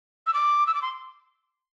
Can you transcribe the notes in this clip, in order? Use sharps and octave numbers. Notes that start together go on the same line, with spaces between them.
E6
D6
E6
D6
C6